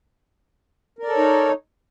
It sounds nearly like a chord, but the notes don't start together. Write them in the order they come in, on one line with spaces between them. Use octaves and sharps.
A#4 D5 A4 C#5 D#4